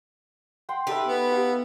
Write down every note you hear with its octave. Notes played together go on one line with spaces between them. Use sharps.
F#5 G5 C6
D#4 G4 A4 B4 E5
B3
F5 F#5